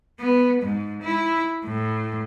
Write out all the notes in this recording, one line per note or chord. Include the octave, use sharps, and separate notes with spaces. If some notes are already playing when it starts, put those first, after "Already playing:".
B3
G#2
E4
A2